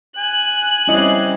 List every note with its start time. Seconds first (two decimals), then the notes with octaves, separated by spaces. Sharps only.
0.18 G#5 F#6
0.88 G3 C4 C#4 E4 D#5